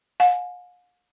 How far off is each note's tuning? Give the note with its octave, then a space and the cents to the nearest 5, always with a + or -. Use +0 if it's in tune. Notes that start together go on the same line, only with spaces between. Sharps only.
F5 +45 G#5 +20